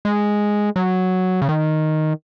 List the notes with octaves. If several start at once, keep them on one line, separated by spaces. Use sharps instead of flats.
G#3
F#3
C#3
D#3